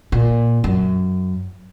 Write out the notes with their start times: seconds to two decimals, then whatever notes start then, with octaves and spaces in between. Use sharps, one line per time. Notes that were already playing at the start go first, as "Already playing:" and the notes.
0.12 A#2
0.64 F#2